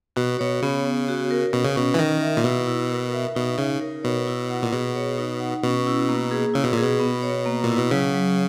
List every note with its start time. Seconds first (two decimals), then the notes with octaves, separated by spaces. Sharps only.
0.16 B2 F#4
0.39 B2 C#5
0.62 C#3 B3
0.86 B3
1.08 F#4
1.31 A#4
1.53 B2 C#4
1.65 C#3
1.76 B2 C#4
1.94 E3
1.99 D#3 A#4
2.22 E5
2.37 A#2
2.44 B2 E4
2.67 E4
2.90 A#4
3.13 E5
3.35 B2 D#4
3.58 C#3 D#4
3.81 A#4
4.03 B2 C#5
4.27 E4
4.50 F#5
4.63 A#2
4.72 B2 G#4
4.95 C#5
5.18 D#4
5.40 F#5
5.63 B2 C#4
5.87 E4
6.09 A#3
6.31 G#4
6.54 C#3 E4
6.64 B2
6.73 A#2
6.78 B2 G#4
7.00 B3
7.23 C#5
7.46 A#3
7.64 A#2 E4
7.77 B2
7.91 C#3 F#3
8.14 F#3